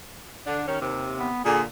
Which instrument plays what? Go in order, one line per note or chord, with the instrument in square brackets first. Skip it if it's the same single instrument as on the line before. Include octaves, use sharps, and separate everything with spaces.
[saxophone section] D3 D4
D#2 D#3 C#4
D#2 C3
[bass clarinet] B3
[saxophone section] A#2 D3 [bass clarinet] G#4